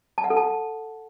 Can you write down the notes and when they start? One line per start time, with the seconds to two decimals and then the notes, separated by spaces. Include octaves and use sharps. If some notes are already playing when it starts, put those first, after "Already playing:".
0.18 A5
0.24 F#5
0.30 A4
0.37 A5